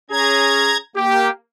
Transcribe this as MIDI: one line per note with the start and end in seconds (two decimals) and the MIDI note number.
0.11 0.78 61
0.11 0.78 68
0.11 0.77 82
0.11 0.77 92
0.96 1.30 58
0.96 1.29 67